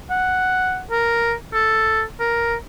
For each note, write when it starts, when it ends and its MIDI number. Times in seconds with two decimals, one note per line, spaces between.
0.10 0.81 78
0.91 1.34 70
1.54 2.03 69
2.20 2.55 70